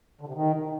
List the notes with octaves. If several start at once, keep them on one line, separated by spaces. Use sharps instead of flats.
D3
C3
D#3